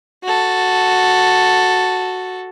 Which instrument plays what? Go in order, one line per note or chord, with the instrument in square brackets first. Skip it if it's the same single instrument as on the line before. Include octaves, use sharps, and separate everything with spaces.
[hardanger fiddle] F#4 A4